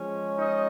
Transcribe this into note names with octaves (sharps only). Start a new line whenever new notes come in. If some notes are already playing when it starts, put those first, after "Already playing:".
Already playing: F3 G#3 C#4
D#4 D#5